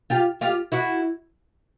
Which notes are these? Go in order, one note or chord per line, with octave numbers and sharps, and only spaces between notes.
F4 G4
F4 G4
E4 F#4